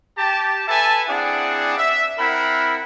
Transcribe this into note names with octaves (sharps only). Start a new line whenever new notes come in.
G4 A5
A4 B4 E5 G#5 A5
C4 D4 E4 G#4 D5 F#5
E5
C4 E4 A#4 F#5 B5